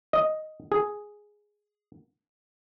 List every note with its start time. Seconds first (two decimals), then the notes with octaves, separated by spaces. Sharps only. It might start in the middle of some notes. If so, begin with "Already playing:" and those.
0.13 D#5
0.72 G#4